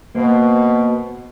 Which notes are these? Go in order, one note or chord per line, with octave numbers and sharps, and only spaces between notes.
B2 A#3 C5